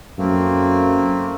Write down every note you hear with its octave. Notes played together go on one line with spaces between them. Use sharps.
F#2 A3 A#3 C4